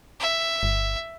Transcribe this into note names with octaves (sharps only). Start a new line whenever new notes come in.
E5
G1